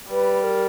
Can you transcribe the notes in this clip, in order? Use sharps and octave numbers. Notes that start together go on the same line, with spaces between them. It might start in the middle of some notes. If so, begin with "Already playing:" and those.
G3 B4
A#4